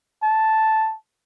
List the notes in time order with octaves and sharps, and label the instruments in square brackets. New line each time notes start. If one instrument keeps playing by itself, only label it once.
[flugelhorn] A5